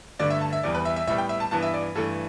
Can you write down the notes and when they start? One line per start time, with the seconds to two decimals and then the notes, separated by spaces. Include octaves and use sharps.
0.19 G2 D3 A3 D5
0.30 E5
0.41 A5
0.53 E5
0.63 E2 E3 G3 B3 D5
0.75 B4
0.85 E5
0.96 E5
1.07 A2 G3 B3 E5
1.18 G5
1.29 E5
1.40 A5
1.51 G2 E3 B3 A5
1.62 E5
1.74 D5
1.95 G2 E3 A3 A4